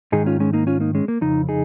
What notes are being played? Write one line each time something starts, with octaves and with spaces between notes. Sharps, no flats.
G#2 D#3 G#3 D#4 G#4
C#4 F4
G#3 C#4
A#3 D#4
C#4 F4
A#3 D#4
G#3 C#4
A#3
F2 C#3 D#4
D#4 G#4